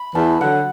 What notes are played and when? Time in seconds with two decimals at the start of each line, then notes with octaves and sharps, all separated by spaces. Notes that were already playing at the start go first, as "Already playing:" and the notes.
Already playing: B5
0.15 E2 A5
0.41 D3 F#3 F#5